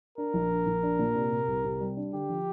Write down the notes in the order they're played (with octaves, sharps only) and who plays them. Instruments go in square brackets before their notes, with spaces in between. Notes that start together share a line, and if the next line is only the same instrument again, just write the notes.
[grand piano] D4 [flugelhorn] A#4
[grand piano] A#1
D4
A#1
D4
A#2
C3
C3
C2
C3
G3
D4
[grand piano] D3 [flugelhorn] G4
[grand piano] F3